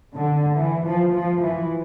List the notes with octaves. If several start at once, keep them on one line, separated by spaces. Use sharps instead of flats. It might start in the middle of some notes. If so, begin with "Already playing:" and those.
D3
E3
F3
F3
E3